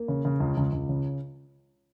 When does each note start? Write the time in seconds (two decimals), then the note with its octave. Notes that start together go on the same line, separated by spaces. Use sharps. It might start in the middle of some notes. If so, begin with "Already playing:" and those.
Already playing: A#3
0.08 C#3
0.25 C#3
0.40 C#2
0.57 C#2
0.73 C#2
0.89 C#3